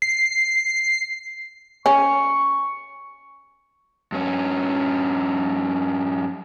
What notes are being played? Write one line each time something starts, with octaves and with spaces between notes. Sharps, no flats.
C7
C#4 C#6
G2 C#4